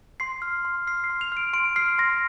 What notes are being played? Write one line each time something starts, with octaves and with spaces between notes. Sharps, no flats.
C6 C7
F6
C6
F6 C7
C7
C6
F7
F6 D7
C6 D7
F6 C7
C6 A#6